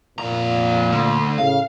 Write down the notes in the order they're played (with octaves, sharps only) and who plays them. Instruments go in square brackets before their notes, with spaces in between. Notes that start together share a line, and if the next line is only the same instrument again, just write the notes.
[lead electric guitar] F2 A#5 [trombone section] A#2
[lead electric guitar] D2
[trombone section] A2 C#3 [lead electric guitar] F5